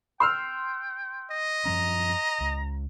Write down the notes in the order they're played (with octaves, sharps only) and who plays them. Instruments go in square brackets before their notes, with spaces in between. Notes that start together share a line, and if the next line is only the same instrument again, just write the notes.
[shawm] G5 [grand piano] C6 E6 F6
[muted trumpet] D#5
[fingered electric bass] F#2 F3 C#4 [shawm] A#5
[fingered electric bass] C#2